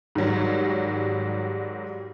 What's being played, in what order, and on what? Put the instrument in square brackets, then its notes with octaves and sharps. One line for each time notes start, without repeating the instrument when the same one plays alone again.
[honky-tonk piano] G#2 D#3 F#3 G3